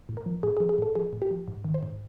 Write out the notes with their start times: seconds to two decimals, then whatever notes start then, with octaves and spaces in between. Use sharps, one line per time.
0.09 A2
0.17 A#4
0.26 F3
0.43 A2 G#4
0.57 F3 G#4
0.69 G#4
0.78 A2 A4
0.95 F3 G#4
1.13 A2
1.22 G4
1.31 F3
1.48 G#2
1.64 D#3
1.74 C5
1.83 G#2